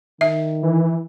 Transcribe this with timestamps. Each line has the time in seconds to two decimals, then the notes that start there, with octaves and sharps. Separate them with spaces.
0.21 D#3 E5
0.63 E3